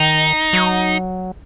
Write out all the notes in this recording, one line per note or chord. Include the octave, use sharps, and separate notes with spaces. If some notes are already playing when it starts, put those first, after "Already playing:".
Already playing: D#3 D#4
F#3